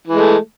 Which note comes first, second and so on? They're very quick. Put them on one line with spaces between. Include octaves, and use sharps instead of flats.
E3 G#3 A3